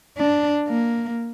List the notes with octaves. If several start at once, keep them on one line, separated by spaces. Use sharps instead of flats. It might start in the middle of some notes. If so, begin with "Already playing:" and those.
D4
A#3